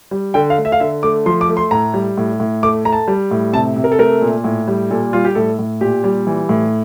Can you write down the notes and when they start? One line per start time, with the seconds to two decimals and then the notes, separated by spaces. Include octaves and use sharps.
0.11 G3
0.34 D3 G5
0.50 F5
0.58 A3
0.65 E5
0.72 F5
0.80 D3 E5
1.03 A3 D6
1.26 F3 C6
1.41 D6
1.49 A3
1.57 C6
1.71 A2 A#5
1.94 G3
2.17 A2
2.40 A2
2.63 A3 D6
2.85 A3 A#5
2.93 A5
3.08 G3
3.31 A2
3.53 C3 A5
3.76 C3
3.84 A#4
3.92 A4
3.99 A3 A#4
4.22 A#2
4.44 A2
4.68 G3
4.90 A#2 A4
5.13 G3 F4
5.25 G4
5.35 A2 A4
5.59 A2
5.81 A#2 G4
6.04 G3
6.27 E3
6.49 A2